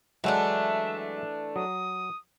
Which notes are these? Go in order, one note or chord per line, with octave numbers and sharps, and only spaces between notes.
E3 F#3 G#3 A3 D4 E5 F#5
F#3 D#6